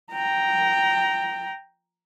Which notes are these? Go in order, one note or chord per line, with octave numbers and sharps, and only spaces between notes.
G5 A#5